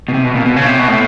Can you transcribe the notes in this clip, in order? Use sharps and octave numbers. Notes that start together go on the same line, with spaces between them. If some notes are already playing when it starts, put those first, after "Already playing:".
B2
C3
B2
A#2
B2
C#3
C3
B2
A2